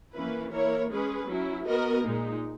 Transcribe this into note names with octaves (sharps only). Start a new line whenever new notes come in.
E3 A#3 C#4 E4 B4
A#3 E4 A#4 C#5
G#3 C#4 G#4 B4
F#3 C#4 E4
B3 F#4 A#4 D#5
A#2 G#3 D#4